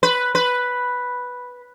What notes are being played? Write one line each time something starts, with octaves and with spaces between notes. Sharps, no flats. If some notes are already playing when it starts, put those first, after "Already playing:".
B4
B4